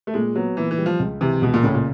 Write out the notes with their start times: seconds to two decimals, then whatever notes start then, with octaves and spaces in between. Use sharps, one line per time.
0.07 A3
0.14 A#2 G#3
0.35 F#3 B3
0.57 A#2 E3
0.71 E3
0.78 G3
0.86 F3
1.00 C#2
1.21 C3 E3
1.42 C#2 B2
1.54 A#2
1.63 A2 C#3
1.74 A#2